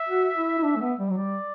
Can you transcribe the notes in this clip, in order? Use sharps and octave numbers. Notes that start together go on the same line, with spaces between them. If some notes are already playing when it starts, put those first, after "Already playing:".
Already playing: E5
F#4
E4
E4
D4
A3
B3
G3
F#3
G3 D5